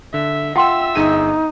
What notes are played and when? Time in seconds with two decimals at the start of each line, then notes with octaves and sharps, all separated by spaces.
0.14 D3 E5
0.56 F4 E5 F#5 G5 C6 E6
0.96 G1 D#4 G#4 D#7